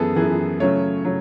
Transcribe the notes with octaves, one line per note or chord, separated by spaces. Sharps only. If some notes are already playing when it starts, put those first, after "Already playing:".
Already playing: F#2 E3 B3 G#4 A4
F#2 E3 B3 G#4
C#3 F#3 A3 C#5
C#3 F#3